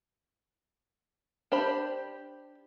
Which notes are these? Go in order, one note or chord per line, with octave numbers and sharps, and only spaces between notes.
D4 G4 C5 B5